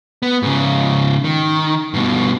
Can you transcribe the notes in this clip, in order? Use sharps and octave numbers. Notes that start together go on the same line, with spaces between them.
B3
G#2 C#3
D#3
G2 B2